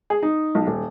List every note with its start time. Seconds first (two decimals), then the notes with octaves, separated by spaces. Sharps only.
0.10 G#4
0.23 D#4
0.55 B1
0.67 D#1